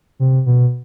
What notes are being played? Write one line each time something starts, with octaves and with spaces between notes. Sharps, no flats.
C3
B2